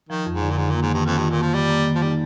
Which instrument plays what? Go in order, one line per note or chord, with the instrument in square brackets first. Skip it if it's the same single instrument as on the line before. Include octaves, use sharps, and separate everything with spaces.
[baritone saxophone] D#3 [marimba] F3
[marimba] F2
[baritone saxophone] G#2
[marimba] D3
[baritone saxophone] A#2
[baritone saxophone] G#2 [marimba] D#3
[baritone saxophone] A#2
[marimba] A#3
[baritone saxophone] G#2
[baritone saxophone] G2 [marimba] D#3
[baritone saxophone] F2 [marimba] F4
[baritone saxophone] G2
[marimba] D#3
[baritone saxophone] A#2
[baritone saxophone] F3 [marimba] A#3
[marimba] D#3 [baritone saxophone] G3
[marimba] A#3
D#3
[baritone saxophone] F3
[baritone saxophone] G3 [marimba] D#4